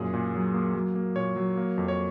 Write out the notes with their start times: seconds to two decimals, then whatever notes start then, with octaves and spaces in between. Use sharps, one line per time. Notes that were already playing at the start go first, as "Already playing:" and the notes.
Already playing: F#2 A#2 G#4
0.14 A#2
0.34 F#3
0.54 A#3
0.75 F#3
0.96 A#3
1.16 A#2 C#5
1.36 F#3
1.57 A#3
1.78 F2
1.88 C#5